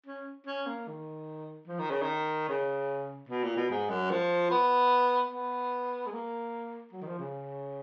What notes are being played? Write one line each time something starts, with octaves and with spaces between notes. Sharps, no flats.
C#4
C#4
A#3
D#3
F3
D#3
C#3
D#3
C#3
B2
A#2
B2
G#2
F#2
F3
B3
B3
G#3
A#3
F#3
D#3
F3
C#3